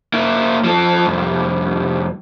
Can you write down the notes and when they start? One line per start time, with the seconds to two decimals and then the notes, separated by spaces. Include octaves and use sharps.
0.14 A#3 E4
0.64 F3 A4
1.06 C2 F2